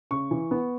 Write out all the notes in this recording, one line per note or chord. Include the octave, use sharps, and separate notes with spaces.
C#3 C#6
E3
B3